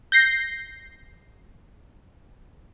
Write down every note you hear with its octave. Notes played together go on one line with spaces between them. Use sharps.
G6 A#6 C7